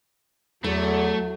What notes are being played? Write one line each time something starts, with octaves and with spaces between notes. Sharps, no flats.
E2 F#3 A3 E4 A4